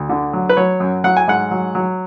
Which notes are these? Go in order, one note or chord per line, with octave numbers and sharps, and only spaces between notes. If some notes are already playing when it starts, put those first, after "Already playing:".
Already playing: D2
D3
F#3
B4
F#3 C#5
F#2
F#3 F#5
G#5
G#2 F#5
F#3
F#3